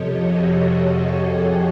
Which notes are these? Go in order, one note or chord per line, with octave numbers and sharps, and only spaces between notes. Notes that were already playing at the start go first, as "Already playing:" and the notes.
Already playing: F2 C3 F3 G4 A4 C#5 D#5
F#4 G#4